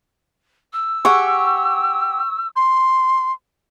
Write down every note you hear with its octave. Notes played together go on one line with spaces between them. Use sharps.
E6
G4 G#4 F#5 C#6
C6